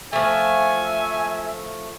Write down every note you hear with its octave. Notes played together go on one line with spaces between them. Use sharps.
F3 A3 E5 G#5